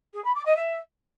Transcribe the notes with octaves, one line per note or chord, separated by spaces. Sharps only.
G#4
B5
D6
D#5
E5